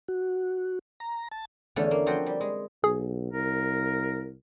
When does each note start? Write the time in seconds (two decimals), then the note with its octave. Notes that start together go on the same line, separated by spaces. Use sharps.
0.08 F#4
1.00 A#5
1.32 A5
1.76 E2 D3 A3 C#4
1.91 A#3
2.06 F3 C4 F#4 G5
2.26 G3
2.41 G#3
2.84 B1 G#4
3.33 C2 A#4